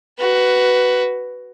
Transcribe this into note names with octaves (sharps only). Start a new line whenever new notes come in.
F#4 B4